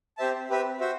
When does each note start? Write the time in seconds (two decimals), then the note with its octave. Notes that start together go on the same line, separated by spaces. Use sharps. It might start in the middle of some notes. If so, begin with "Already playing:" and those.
0.18 C4 G4 C5 E5 A5
0.50 C4 G4 B4 E5
0.80 F#4 C5 E5